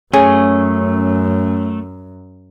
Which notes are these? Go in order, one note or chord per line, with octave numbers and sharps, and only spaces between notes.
F#2 A3 C#4 G#4